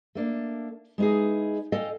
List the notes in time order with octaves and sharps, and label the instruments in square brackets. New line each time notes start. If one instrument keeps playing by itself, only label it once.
[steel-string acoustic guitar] A3 A#3 D4
G#3 B3 D#4 E4 G#4
A4 D#5 F5 G5 G#5